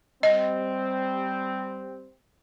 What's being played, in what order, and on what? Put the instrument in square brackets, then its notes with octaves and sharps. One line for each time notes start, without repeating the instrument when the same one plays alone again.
[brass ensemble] G3 C4 [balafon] D#5